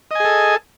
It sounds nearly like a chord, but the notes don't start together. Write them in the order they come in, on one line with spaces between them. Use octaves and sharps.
D#5 G#5 G#4 A4